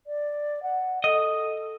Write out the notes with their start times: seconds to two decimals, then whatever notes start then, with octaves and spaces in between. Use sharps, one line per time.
0.07 D5
0.63 F#5
1.04 A4 D#5